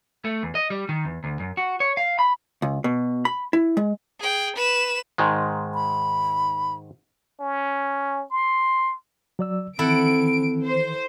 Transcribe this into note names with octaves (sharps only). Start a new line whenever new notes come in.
A3
E2
D#5
G3
D#3
E2
D2
F#2
F#4
C#5
F5
B5
C#2
B2
B5
E4
G#3
G#4 G5
B4 E7
G#2 D#3 G#3
B5
C#4
C6
F#3 D5 E6
D#3 E3 C4 E4 A4 F#5 D7
C5